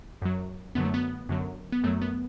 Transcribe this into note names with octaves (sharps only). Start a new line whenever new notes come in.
F#2 F#3
F#2 D3 F#3 B3
A3
B3
F#2 D3 F#3
B3
F#2 F#3 A3
B3